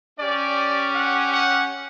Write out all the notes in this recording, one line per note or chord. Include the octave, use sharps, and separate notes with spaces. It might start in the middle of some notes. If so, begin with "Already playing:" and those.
C#4 G4 D5
F#5
F#5